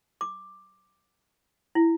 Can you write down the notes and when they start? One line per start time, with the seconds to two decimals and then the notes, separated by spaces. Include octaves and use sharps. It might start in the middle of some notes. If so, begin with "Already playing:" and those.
0.21 D6
1.75 E4